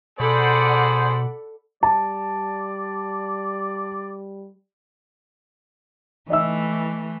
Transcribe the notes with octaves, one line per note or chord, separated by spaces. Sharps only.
B2 G#4 A4 C5 D5 F#5 B5
G3 D5 A5
E3 A3 D#5 E5 E6